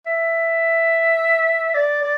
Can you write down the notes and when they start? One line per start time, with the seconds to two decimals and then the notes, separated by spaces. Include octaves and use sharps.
0.07 E5
1.74 D5
2.03 D5